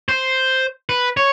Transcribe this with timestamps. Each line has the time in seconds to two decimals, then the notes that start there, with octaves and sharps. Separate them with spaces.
0.09 C5
0.89 B4
1.17 C#5